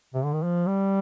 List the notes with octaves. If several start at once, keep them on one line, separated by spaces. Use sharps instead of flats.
C3
D3
D#3
F3
G3